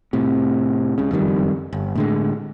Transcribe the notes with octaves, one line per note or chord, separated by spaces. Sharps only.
A2 C3
C#2 C#3
F#1 F2 D#3 G3
G1
A2 D3 G#3